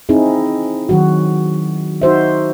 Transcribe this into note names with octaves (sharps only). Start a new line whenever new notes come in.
C4 D#4 E4 G#4
D#3 F#3 F#4
D#4 F#4 C5 E5